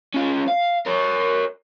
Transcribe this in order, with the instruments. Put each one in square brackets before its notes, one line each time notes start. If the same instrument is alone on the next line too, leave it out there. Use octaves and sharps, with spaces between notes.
[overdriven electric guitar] C#4 F4
F5
A#4 C#5